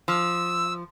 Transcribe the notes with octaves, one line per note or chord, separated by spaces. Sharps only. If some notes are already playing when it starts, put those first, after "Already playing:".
F3 E6